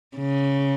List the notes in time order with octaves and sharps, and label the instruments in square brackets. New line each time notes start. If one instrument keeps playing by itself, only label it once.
[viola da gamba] C#3